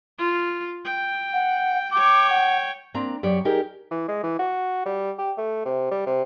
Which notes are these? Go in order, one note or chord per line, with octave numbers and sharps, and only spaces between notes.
F4
G5
F#5
C#5 G5 D6
F#5
A#3 C4 D4 A#5
F#2 G4 C#5 D5
D#4 G4 G#4 A#4
E3
G#3
E3
F#4
G3
G4
A3
C3
G3
C3